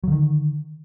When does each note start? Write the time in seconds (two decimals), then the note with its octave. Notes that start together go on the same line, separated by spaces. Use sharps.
0.04 F#3
0.08 D3
0.12 D#3